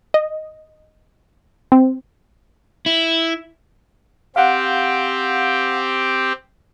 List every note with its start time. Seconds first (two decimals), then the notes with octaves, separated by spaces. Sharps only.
0.14 D#5
1.72 C4
2.86 E4
4.36 C4 G4 F5 F#5